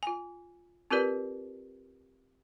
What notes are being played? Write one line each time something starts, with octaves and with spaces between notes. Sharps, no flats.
F4 G#5
C4 F4 G4 A#4 B4 D5